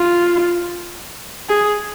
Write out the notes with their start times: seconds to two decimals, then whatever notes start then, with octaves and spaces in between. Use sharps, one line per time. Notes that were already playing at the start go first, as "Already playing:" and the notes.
Already playing: F4
1.49 G#4